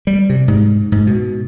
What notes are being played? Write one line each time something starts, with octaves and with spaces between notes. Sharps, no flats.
G3
C3
G#2
G#2
B2